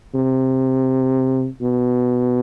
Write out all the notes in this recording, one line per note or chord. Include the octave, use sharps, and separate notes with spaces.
C3
B2